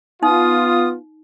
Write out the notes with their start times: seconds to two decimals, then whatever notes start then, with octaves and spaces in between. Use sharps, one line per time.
0.23 B3 D#4 F4 D#6